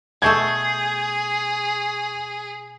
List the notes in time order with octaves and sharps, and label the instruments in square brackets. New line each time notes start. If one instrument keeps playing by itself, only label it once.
[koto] B2 A3 A4 [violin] G#4 [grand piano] C#6 G6 G#6